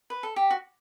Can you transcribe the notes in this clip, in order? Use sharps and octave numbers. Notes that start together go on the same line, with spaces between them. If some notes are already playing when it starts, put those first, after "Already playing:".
B4
A4
G4
F#4